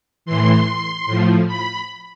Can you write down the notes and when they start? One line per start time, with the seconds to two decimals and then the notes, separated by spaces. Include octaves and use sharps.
0.26 A2 E3 C6
1.06 A2 F3
1.47 B5